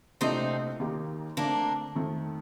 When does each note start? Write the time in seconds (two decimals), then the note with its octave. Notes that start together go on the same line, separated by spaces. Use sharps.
0.21 C2 A#2 A3 C4 D4 D#4 G4
0.80 D#2 D#3 A#3 D#4 G4
1.37 D3 A3 A#3 C4 D4
1.95 F2 D#3 A3